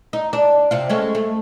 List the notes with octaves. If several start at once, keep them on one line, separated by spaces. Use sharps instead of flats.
D#4
D4
C3 F4
G#3 A3 C#4
A3